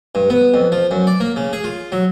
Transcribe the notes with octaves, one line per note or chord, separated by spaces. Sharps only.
G2
B3
F2
F3
F#2
D5
A#3
C#3
G#4
F4
F#3